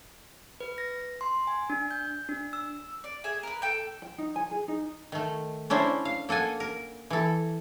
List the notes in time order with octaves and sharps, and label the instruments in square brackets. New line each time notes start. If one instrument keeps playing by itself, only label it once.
[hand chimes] B4
A#6
C6
G#5
D4
G6
D4
E6
[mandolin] D5
G#4 E5 G#5
A#4 B4
A4 G5 G6
[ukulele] G5
D#4
G#5
G#4
D#4
[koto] D#3 A3
C#4 D4 E4 C5
F5
A#3 A4 F#5 G#5
A#4
E3 A4